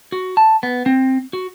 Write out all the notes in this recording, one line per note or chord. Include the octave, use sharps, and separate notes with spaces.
F#4
A5
B3
C4
F#4